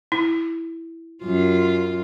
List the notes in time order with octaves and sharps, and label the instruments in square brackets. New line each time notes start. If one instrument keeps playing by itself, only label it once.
[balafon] E4
[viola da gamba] F#2 F4